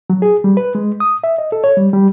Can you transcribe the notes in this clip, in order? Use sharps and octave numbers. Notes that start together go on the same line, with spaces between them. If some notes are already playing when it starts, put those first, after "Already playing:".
F#3
G#4
G3
B4
G#3
D#6
E5
D#5
A4
C#5
G3
G3